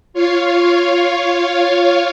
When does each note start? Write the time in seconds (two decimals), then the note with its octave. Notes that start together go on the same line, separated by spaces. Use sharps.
0.14 F4 C#5 F5